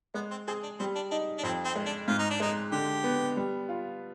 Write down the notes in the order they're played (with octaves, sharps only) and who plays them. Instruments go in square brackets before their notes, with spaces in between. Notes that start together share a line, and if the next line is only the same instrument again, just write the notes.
[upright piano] G#3 [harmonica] B3
[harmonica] C4
[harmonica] C4 [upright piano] G#4
[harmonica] D4
[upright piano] G3 [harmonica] C4
[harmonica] D4
[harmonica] D4 [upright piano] D#4
[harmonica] D4
[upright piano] F2 [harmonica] C4
[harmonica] C4
[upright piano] G#3
[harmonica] D4
[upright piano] G#2 [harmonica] F4
[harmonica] D#4
D4
[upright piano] G#3 [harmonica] D#4
[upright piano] D3 [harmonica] G4
[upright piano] B3
G3
F4